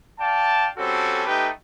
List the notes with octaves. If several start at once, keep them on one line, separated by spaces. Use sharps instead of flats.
D5 F5 G5 A5
G3 C4 C#4 F#4 A4
A3 B3 D#4 G4 B4 G5